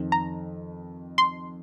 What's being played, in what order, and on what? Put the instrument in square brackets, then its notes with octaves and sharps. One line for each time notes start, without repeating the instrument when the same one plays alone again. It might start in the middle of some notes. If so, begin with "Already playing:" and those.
Already playing: [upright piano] F2 D#3 C4 D#4
[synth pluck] A#5
C6